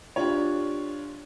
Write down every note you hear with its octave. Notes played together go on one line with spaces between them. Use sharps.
D4 F4 G4 C#5